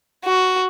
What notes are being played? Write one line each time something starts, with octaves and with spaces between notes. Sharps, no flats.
F#4